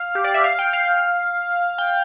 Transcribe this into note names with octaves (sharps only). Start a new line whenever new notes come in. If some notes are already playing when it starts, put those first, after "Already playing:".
Already playing: F5
G4
D5
E5
F5
G5
F5
G5